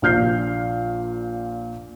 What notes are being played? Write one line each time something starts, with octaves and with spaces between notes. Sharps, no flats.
A#1 A#2 F6 G6 C7